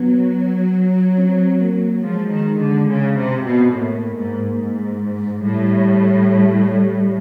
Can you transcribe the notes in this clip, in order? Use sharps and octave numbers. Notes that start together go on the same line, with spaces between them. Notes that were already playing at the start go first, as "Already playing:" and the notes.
Already playing: F#3 B3
C4
A#3
F3 G#3
D#3
D3
C#3
C3
B2
A2 A#3
G#2
G#2
A2 G3